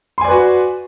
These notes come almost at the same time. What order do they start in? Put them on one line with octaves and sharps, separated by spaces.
C6 G#5 D5 B4 F#4